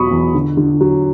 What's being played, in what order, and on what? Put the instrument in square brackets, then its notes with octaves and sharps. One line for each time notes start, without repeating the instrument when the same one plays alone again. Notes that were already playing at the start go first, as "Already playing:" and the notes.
Already playing: [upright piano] E2 B2 F#3 B5 C#6 D#6
E2
D3
D3
F#3